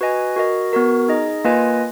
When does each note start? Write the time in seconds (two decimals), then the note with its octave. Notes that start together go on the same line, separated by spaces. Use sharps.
0.01 F#4 B4 D#5 G#5
0.36 F#4 A#4 D#5
0.73 B3 F#4 A#4
1.09 D#4 G#4 D#5
1.45 A#3 F4 B4 D#5 G#5